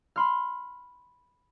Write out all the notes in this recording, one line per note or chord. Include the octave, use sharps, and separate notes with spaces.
B5 C6 F6